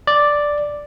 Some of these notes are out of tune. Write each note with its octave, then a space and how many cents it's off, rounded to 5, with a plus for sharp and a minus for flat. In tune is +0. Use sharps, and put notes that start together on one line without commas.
D5 +0